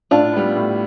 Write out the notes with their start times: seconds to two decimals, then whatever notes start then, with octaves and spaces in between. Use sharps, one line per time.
0.11 A2 D4 F4
0.33 G3 B3
0.56 A2